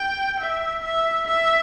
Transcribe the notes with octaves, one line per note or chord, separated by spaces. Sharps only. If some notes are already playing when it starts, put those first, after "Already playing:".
Already playing: G5
E5
E5
E5